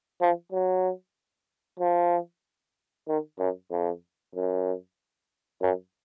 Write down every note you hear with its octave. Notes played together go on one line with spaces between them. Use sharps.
F3
F#3
F3
D#3
F#2
F2
F#2
F#2